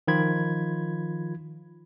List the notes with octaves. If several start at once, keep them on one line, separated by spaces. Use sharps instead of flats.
D#3 F3 F4 B5 G#6